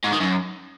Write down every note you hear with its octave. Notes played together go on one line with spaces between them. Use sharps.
G#2
D#3
F#2